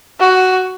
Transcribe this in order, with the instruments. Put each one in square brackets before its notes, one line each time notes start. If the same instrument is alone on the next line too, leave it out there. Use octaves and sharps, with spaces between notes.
[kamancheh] F#4